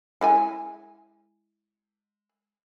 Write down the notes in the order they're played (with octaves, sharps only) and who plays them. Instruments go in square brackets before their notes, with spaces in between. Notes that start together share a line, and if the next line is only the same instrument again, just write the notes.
[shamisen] G#3 E4 G#5